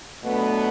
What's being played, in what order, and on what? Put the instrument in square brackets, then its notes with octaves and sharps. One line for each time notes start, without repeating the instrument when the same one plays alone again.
[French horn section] B2 F#3 B3 D4 [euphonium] A3